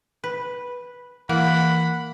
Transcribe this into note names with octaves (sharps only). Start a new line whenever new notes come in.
B4
E3 A#3 F#5 B5